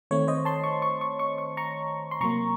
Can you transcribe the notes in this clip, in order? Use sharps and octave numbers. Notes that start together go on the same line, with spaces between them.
D#3 A3 C4 C#5
C5 D#5
A5 C6
C#6
C#6
C#6
C#6
C#6
A#5 C#6
C6
C3 F#3 A#3 A#5 C#6